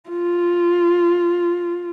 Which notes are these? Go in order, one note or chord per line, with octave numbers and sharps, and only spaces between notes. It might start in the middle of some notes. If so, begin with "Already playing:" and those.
F4